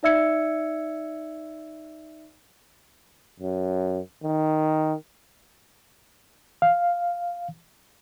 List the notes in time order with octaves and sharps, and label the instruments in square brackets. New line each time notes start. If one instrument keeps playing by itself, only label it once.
[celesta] D#4 D5 E5 E6 G#6 C#7
[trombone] F#2
D#3
[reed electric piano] F5